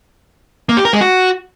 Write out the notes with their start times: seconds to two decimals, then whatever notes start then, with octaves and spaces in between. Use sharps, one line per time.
0.69 A#3
0.77 G4
0.85 A#4
0.93 G#3
1.01 F#4